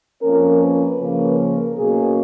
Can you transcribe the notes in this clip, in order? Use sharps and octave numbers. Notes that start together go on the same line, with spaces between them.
F2 F3 A#3 C#4 A#4
B4
C#3 F3 A#3 C#4
A#4
B2 F#3 A#3 C#4 G#4